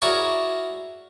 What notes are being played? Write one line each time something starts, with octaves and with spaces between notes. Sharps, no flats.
E4 F#4 G#4 A#4 C#5 D5